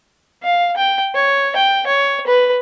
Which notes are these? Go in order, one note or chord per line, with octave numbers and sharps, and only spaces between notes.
F5
G5
C#5
G5
C#5
B4